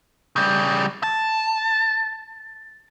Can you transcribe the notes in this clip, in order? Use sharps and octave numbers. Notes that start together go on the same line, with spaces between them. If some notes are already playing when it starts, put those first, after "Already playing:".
C#3 G3
A5